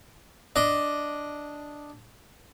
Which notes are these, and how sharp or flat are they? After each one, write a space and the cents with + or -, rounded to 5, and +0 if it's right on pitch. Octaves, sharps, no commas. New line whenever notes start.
D4 +0 D#5 +0